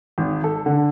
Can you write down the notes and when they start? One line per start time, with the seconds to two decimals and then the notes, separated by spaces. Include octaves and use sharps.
0.18 G#1
0.44 A4
0.66 D3